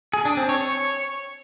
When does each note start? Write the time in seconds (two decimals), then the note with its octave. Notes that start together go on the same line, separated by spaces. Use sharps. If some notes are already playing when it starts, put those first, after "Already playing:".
0.14 G#4
0.25 D4
0.37 C4
0.49 C#5
0.61 C#5